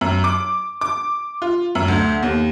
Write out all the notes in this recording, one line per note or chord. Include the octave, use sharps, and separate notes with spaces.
F#2
D6
D6
F4
F#2
D2
D#2